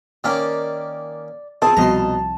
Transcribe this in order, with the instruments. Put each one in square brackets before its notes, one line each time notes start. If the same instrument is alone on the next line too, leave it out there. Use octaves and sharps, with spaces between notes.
[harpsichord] D#3 A#3 C#4 [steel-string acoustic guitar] D5
[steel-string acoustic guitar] F3 C4 [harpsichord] G#4 [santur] A5
[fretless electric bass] C2 F3 G3 [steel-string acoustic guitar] F2 B2 D#5 [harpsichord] A#5 C6